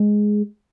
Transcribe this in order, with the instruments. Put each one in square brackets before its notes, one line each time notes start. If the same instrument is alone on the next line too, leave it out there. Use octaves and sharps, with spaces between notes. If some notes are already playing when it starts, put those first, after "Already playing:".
Already playing: [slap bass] G#3